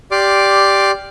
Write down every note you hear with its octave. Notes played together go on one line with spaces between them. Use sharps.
G4 D5 C6 D6 F6